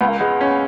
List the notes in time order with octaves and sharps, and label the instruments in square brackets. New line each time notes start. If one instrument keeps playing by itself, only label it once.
[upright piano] C#2 [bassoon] B3
[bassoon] A#3
[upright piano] G#3 [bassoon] B3
[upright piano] C#4